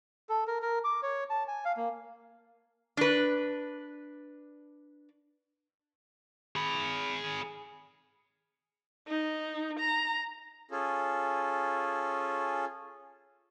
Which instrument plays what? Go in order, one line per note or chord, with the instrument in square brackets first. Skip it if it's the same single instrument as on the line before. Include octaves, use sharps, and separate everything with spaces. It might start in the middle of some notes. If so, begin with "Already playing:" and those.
[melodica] A4
A#4
A#4
D6
C#5
A5
G#5
F5
A#3
[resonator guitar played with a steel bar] D4 B4
[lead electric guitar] G#4 B5
[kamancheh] D#4
A#5
[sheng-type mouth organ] C#4 F4 G#4 A4